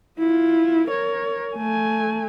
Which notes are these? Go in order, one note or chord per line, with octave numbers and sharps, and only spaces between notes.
E4 F4
A#4 C#5
A3 G#5